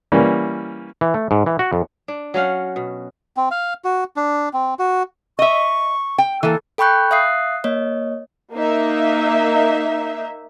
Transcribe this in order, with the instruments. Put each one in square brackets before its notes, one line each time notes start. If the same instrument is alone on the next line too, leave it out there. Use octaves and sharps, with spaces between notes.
[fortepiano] E3 G3 A#3 C#4
[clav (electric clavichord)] E3
A3
G#2
E3
F#4
F2
[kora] D4
F#3 C#4 F5 F#5
B2
[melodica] C4
F5
F#4
D4
C4
F#4
[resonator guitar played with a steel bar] D#5 E5 [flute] C#6
[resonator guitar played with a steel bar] G5
[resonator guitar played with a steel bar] E3 A#3 [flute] A4
[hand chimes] A4 G5 B5 C#6 F#6 G6
E5 F5 D#6 F#6 C7
A#3 C#5 D#5
[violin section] A#3 D#4 E5